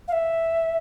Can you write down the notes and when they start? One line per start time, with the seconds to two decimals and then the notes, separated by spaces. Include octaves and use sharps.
0.08 F5
0.12 E5